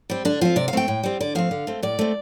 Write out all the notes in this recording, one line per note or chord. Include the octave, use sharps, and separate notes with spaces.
G3 C4
D3 D4
F3 C4 F4
C3 D5
F5
A3 C4 G5
A2
G3 C4
D3 D5
F3 A3 C4 F5
D3
A3 C4
A2 D5
A3 C4